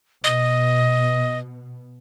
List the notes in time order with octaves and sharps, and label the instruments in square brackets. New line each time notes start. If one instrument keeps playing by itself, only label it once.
[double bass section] B2 [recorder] D#5